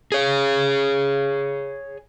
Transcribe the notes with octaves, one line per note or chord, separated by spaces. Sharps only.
G#4 C#5